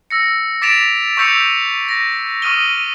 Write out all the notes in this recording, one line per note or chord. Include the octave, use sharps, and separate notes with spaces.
E6 A#6 C#7
D6 A6 B6 D7 E7 F7
C#6 E6 G6 B6 C#7 F7
A#6
C#6 D#6 F6 D#7 G7